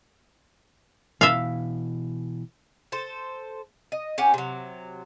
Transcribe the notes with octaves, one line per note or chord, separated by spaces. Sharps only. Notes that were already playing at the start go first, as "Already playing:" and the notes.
B2 E3 E5 F5
A4 C5
D#5
C#4 G4 F#5 G#5
C3 F#3